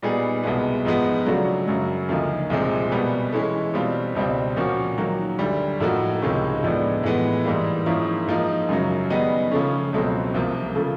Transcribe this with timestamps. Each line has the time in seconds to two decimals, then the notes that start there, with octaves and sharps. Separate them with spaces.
0.02 A#2 G3 B3 D#4 G#4
0.43 C2 B2 G#3 B3
0.85 G#2 F3 G#3 B3
1.26 C#3 F#3 A3 D4 F#4
1.68 F#2 C#3 F#3
2.09 D2 C#3 F3 A#3 D#4
2.50 C2 A#2 F3 G#3 C4
2.92 B2 G3 B3
3.32 E3 G#3 C#4 E4 A4
3.74 B2 G3 C4 F4
4.15 C#2 B2 G3 C4
4.56 A#2 F3 A#3 C#4 F#4
4.98 D#3 F#3 A#3
5.39 D2 D3 G3
5.80 A2 F3 A#3 D#4 F#4
6.22 C#2 C3 D#3 G#3 C#4
6.63 A2 F3 G#3 B3 D4
7.04 A2 E3 G#3 B3
7.45 G#2 E3 G3 A#3
7.86 G#2 F3 A#3 C#4 E4
8.27 G#2 F3 A#3 D#4
8.69 F#2 C#3 F#3
9.10 D#3 G3 B3 D#4 G#4
9.51 C#3 F3 A3 C#4
9.93 C#2 B2 F#3 A3 C4
10.34 C2 C3 F3 A#3
10.75 C#3 F3 A3